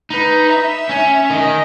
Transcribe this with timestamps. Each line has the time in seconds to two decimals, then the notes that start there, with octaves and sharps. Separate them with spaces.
0.10 D#4 B4
0.50 E5
0.89 C#4
1.30 D#3 D#5